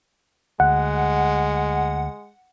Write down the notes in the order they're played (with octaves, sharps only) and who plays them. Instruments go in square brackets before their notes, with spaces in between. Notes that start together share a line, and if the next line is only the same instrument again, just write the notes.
[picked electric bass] D2 [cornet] G#3 [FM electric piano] F#5